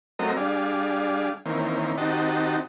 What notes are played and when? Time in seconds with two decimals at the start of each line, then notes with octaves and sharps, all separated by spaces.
0.19 F#3 A3 C4 A#4 D#5
0.37 G3 D4 G#4 F5
1.46 D#3 E3 A#3 C4 C#4
1.97 D#3 C4 D#4 F#4 G4 A5